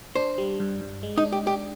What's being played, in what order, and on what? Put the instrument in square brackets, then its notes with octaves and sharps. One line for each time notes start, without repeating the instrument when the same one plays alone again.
[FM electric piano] D4 [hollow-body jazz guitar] C5
[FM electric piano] G3
G2
G2
G#3
[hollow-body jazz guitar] D#4
[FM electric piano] D4
[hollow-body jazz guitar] G4
[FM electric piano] D4 [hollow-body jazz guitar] G4